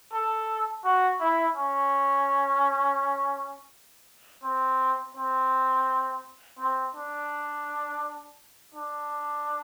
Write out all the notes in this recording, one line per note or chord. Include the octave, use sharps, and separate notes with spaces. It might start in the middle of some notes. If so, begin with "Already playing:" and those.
A4
F#4
E4
C#4
C4
C4
C4
D4
D4